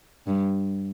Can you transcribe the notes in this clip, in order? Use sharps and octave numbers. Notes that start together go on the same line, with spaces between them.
G2